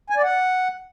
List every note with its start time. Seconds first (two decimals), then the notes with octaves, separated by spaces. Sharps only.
0.10 G#5
0.17 D5
0.23 F#5